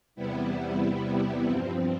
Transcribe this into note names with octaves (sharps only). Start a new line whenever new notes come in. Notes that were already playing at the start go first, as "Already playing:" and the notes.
E2 C3 G3 B3 E4
G2 F3 C4